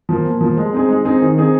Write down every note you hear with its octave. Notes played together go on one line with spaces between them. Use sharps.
F3 A#3
A#2
F3 A#3
G#3
C4 D#4 G#4
G#3
C4 D#4 G#4
D#3
C4 D#4 G#4